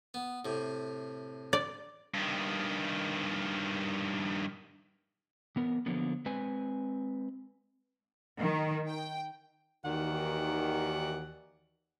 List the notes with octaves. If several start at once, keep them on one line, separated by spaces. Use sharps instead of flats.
B3
A2 C3
D5
G2 D#3
E3 B3 A#4
D3 F3 F#3 A#3 B3
G#3 C4 B4 G#5
D#3
G5
D#2 D#3 E3 F#4 D5 F#5